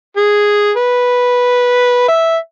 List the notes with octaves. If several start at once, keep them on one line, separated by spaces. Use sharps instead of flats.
G#4
B4
E5